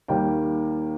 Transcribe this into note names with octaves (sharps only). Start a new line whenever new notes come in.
D#2 D#3 G3 A#3 G5